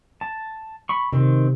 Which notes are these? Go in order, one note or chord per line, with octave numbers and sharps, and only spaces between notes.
A5
B5 C#6
C3 D#3 C4